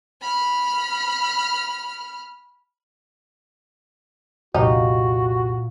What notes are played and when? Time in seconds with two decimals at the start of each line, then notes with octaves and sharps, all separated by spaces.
0.21 B5 F6
4.54 C2 F2 A#2 D#4 F#4 G4